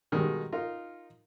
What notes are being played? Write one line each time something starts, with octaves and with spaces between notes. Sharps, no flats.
B2 D#3 G3 G#3
D#4 F4 A#4